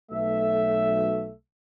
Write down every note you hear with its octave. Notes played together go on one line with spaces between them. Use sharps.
B1 A3 E5